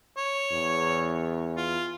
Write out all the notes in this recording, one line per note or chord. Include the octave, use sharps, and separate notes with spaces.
C#5
E2
F4